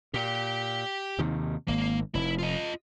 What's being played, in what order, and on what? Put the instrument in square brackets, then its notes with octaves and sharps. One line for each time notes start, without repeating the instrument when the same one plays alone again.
[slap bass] A#2 [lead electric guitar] G4 G5
[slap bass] D#2 C3 D#3
[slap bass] G#1 [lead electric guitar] A#3
[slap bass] F1 [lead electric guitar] E4
[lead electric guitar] F4 D#5